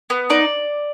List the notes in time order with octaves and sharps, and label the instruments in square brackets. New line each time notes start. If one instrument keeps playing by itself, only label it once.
[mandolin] B3
D#4 D5